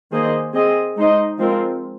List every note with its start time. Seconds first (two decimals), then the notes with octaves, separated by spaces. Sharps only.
0.12 D#3 A#3 G#4 C5 D#5
0.54 C4 G#4 D#5
0.96 G#3 D#4 C5 D#5
1.39 F3 G#3 C4 F4 A#4